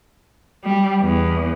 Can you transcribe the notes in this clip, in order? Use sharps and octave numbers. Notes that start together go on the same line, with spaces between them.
G3
E2